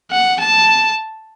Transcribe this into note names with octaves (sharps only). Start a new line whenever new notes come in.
F#5
A5